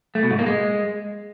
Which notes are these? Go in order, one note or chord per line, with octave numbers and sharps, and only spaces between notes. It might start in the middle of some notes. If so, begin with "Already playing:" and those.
A3
B2
G#2
A#3
G#3